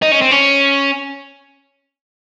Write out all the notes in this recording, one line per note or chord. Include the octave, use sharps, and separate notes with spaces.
D#4
C#4
C4
C#4